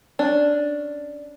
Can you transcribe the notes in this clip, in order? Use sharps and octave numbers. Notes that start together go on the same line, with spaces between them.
C#4 D4